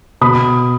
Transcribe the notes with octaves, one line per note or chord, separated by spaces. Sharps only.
B2 B5 D#6